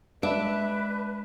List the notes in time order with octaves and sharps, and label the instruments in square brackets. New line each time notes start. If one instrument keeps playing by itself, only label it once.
[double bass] G#3 [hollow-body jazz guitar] D4 [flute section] B4 [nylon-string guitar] E5